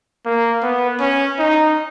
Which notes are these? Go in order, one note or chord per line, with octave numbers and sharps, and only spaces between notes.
A#3
B3
C#4
D#4